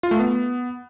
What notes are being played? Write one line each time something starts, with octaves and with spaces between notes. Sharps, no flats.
F4
A3
B3